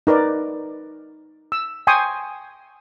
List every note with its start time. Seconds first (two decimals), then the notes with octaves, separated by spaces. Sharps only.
0.07 D#4 A#4 B4 D5
1.52 E6
1.87 G5 G#5 C6 C#6 D#6